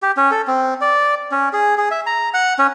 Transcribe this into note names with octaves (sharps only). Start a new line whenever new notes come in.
G4
C#4
A4
C4
D5
C#4
G#4
G#4
E5
A#5
F#5
C#4